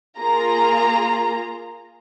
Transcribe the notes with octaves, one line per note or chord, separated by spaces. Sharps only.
A#3 F4 G#4 A#5